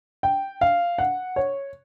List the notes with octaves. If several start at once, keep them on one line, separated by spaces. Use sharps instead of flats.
G5
F5
F#5
C#5